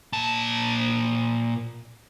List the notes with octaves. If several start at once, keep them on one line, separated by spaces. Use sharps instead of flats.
A#2 A5